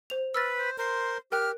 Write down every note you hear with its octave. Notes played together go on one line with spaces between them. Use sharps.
C5 F7
B4 E6 F6 A6
C5
A#4 C5 C6
G4 A#4 G5 F6 F#6